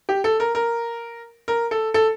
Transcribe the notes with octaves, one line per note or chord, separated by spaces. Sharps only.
G4
A4
A#4
A#4
A#4
A4
A4